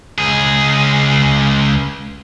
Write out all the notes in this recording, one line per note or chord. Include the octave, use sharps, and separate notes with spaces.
C#2 G#4